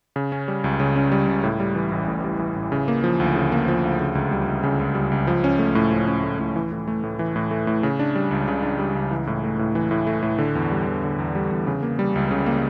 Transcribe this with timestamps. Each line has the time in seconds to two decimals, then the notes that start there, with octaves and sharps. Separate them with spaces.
0.16 C#3
0.32 C#4
0.48 G3
0.64 C#2
0.80 C#3
0.96 C#4
1.12 G3
1.27 C#2
1.44 A2
1.60 G3
1.75 E3
1.92 A1
2.08 A2
2.24 G3
2.39 E3
2.56 A1
2.72 C#3
2.88 A#3
3.04 F3
3.20 D2
3.36 C#3
3.52 A#3
3.68 F3
3.84 D2
4.00 C#3
4.15 C#2
4.31 G3
4.48 C#2
4.64 C#3
4.80 C#2
4.95 G3
5.12 C#2
5.27 F3
5.44 C#4
5.59 A3
5.75 A2
5.92 F3
6.07 C#4
6.23 A3
6.39 A2
6.56 E3
6.72 A2
6.88 A3
7.03 A2
7.19 E3
7.36 A2
7.51 A3
7.67 A2
7.83 C#3
7.99 D4
8.15 G3
8.31 C#2
8.48 C#3
8.63 D4
8.79 G3
8.95 C#2
9.11 E3
9.27 A2
9.44 A3
9.59 A2
9.75 E3
9.91 A2
10.07 A3
10.23 A2
10.38 D3
10.55 E2
10.72 G3
10.87 E2
11.03 D3
11.19 E2
11.35 G3
11.51 E2
11.67 C#3
11.83 A#3
11.99 G3
12.16 C#2
12.31 C#3
12.46 A#3